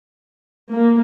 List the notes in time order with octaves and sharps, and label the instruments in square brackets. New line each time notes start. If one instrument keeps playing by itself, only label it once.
[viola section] A#3